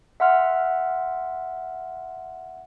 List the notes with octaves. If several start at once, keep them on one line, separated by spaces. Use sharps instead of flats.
E5 F#5 C6 F6